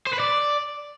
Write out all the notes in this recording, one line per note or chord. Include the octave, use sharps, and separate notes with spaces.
C5
B4
D5